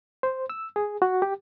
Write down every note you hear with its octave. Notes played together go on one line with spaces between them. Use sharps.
C5
E6
G#4
F#4
G4